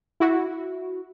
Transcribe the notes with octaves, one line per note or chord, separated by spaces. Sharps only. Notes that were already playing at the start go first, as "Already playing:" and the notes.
E4 F#4